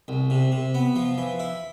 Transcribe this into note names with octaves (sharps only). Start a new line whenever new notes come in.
C2
C3
C3
B3
F3
E3
E4